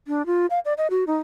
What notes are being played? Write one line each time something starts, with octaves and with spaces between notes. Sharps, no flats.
D4
F4
F5
D5
D#5
F#4
D#4